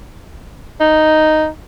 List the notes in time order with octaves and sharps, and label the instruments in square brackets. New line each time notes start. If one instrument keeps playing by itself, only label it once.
[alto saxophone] D#4